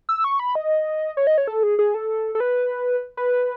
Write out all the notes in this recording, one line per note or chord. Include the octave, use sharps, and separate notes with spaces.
E6
C#6
B5
D#5
C#5
D#5
C#5
A4
G#4
G#4
A4
A4
B4
B4